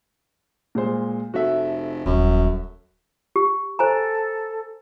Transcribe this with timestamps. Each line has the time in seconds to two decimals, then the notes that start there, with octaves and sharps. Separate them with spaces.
0.75 A#2 G#3 C5
1.34 F1 F#4 A4 E5
2.06 D#1 F#2
3.36 G4
3.79 A4 C5 G#5 A#5